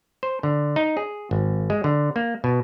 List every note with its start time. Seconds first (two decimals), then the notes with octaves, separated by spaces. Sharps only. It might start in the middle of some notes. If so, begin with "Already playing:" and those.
0.23 C5
0.43 D3
0.76 D#4
0.97 G#4
1.31 G#1
1.70 G#3
1.84 D3
2.16 A#3
2.44 B2